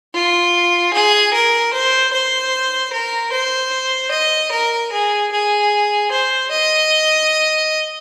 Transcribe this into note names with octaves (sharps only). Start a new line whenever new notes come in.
F4
G#4
A#4
C5
C5
A#4
C5
D#5
A#4
G#4
G#4
C5
D#5